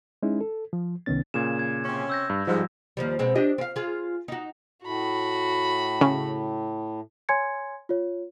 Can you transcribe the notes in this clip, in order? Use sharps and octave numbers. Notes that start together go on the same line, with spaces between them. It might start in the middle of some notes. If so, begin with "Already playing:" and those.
G#3 C#4 D#4 E4
A4
F3
C2 C3 D#3 B3 C#4 A6
A#2 C#3 G#6 E7
G#6
C3 C#4
E6 G6 A#6
G2
G#2 F3 G3
D#2 F3 G3
B2 G#3 C4
D4 G4 D#5
C4 F5
F4 G#4
D#4 F#4
A2 F#4 B5
C#3
C#5 G#5 C6 G#6 C#7
F4 C#5